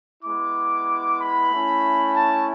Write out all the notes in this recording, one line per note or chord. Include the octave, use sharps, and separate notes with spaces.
G#3 B3 E4 D6
B5
A3 C#4 E4
A5